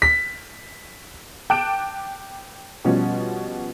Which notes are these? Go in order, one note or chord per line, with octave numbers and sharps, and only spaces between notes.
B6
G5 A5 D6 F#6 D7 E7
B2 F3 G3 C#4